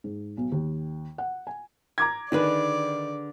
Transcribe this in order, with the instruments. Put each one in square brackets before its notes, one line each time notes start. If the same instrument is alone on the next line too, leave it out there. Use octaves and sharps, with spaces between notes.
[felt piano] G#2
B1
D#2
F#5
G#5
[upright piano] A#5 D6 G#6
[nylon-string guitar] D3 G#4 B4 [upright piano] D#3 [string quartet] D5